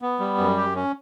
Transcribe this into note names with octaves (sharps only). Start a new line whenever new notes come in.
B3
G3
F#2
G4
C#4